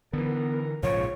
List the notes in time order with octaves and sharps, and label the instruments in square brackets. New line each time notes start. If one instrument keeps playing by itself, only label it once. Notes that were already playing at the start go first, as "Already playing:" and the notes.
[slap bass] D3 E3 [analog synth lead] B3 [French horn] A#4
[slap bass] A#1 G#2 C#3 [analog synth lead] F3 [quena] C#5